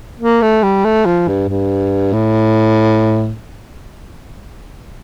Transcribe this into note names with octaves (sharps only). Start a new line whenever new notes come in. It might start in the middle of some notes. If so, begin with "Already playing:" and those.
A#3
A3
G3
A3
F3
G2
G2
A2